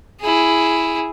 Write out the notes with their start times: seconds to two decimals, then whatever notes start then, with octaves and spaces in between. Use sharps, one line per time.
0.21 E4 G#4